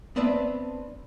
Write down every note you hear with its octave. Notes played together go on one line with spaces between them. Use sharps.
B3 C4 D4 B4 D5 E5